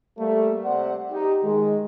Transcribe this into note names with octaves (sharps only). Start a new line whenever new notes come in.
G3 A3 A#3
C3 C5 D5 F#5
D#4 G4
D#3 G#3